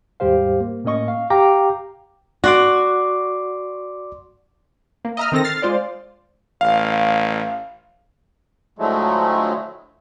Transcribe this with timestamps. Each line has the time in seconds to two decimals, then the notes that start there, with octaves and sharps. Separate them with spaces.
0.20 D#2 G#2 G3 G4 C5 F5
0.61 A#3
0.84 A2 A#3 C#4 D#5 C#6
1.08 F5
1.30 G4 F5 G5 A#5 D6
2.44 F#4 D5 C6 D6
5.05 A#3
5.17 D#5 E5 A#5 D#6 F6
5.32 D#3 C4 A4 A#6
5.44 F6 A6 C7
5.62 G#3 F4 C5 D5
6.61 A1 F5
8.79 A2 D3 F3 F#3 G#3 A3